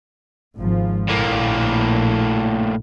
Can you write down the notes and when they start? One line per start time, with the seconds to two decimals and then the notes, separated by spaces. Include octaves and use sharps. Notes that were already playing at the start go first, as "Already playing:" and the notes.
0.57 G#1 G#2 F3
1.09 A#1 A2 A#3